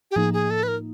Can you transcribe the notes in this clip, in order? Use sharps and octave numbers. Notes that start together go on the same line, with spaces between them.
G4
A2 F3 A#3 D#4 G#4
G#4
A4
B4
A#4